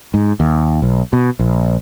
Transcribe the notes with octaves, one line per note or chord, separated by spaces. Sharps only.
G#2
D#2
B1
B2
A#1